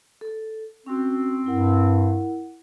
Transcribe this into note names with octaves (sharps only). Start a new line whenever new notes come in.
A4
C4 C#4 F#4
G2 E4 A#4 F#5